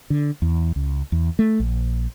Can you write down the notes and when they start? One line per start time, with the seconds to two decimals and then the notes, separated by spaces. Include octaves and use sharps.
0.10 D3
0.42 E2
0.76 C#2
1.12 E2
1.39 A3
1.60 A#1